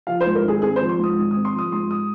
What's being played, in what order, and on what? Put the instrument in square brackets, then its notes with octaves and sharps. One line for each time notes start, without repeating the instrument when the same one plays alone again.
[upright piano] F3 F5
C5
G#2
A#4
G#1 G#4
C4 G#4
C5
F3
C6
G#2
D#6
G#1
D#6
C4
C6
F3 D#6
G#2 C6
D#6